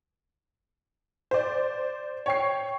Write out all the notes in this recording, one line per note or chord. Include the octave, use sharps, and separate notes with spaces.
C5 D5
C#5 G5 C7